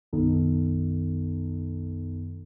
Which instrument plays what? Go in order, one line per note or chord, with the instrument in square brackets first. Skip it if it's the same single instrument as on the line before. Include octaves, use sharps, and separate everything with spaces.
[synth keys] B1 F#2 D#3 B3 D#4 A4